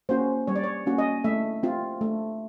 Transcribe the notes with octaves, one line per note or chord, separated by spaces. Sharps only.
A#3 C#4 F#4 C5
G3 C#5
D5
C#5
A#3 C#4 F#4
D#5
A3 E5
C4 F4
A3